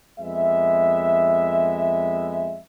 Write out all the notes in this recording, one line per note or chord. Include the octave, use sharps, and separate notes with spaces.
F2 G#3 B3 E5